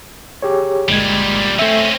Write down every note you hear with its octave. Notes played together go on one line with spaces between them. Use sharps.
G4 G#4 C#5
G1 A#2 G3 G#3 G#6
A3 C4 C#4 E5